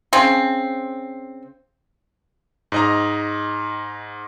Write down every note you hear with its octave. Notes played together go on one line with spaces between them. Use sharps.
C#3 C4
G#2 D#5 A#5